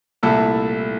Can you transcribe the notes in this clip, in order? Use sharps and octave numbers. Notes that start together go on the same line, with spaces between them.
C2 A#2 A3 E4 A4